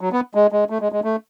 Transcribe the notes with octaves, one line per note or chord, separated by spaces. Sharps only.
F#3
B3
G#3
G#3
A3
G#3
G#3
A3